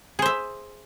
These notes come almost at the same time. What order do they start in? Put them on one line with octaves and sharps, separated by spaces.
G#4 C5 E5